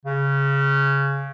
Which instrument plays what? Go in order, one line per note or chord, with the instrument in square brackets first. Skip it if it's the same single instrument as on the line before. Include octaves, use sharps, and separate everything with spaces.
[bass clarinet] C#3